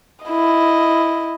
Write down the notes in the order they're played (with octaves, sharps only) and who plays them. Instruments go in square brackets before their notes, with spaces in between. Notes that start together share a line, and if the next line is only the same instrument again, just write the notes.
[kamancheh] E4 D#5